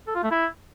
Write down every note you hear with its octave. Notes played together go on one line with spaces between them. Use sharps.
A4
F4
A3
E4